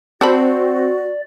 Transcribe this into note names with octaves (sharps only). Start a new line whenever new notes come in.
C4 F#4 A4 D5 A5 B5